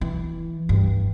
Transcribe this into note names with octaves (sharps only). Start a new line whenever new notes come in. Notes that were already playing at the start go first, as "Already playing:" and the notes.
E3
G2